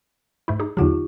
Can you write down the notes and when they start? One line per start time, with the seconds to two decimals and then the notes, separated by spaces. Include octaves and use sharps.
0.48 G#2 A3 E4
0.60 D#4 G4 G#4
0.77 E2 D3 F#3 D#4 F4 G4